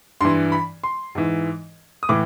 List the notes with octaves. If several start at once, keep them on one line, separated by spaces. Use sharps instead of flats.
G2 E3 C6
B5
C6
G#2 E3
D#6
A2 E3 D6